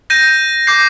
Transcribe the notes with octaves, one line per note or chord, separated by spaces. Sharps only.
G6 A#6 D#7
D6 G6 C7